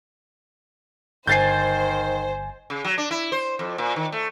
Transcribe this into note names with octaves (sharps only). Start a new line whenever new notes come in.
G1 D#3 C5 G#5 G6 A6 C7
C#3
F#3
D4
E4
C5
F2
A#2
D#3
A3